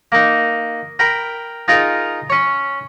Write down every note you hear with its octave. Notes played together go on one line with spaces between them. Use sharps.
A#3 D#4
A#4 G5 B5
D#4 F4 G#4 A#4
C#4 C#5